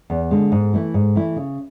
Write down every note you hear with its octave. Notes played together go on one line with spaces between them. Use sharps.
E2
D3 G#3
G#2
E3 A3 E4
G#2
E3 A3 E4
C#3